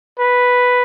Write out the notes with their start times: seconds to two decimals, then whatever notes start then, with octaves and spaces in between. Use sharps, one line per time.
0.19 B4